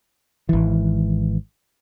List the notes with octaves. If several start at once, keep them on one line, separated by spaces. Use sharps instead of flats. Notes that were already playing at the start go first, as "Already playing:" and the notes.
G#1 E3